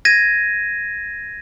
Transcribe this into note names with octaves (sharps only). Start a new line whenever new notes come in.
G#6 A#6 D#7